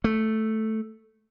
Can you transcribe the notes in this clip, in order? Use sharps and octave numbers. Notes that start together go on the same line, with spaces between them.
A3